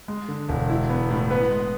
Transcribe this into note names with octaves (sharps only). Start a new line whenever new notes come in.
G#3
D3
E1
E4
B3
A2
B3 B4
G#3